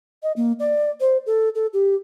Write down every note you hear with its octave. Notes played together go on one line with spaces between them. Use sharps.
D#5
A#3
D5
C5
A4
A4
G4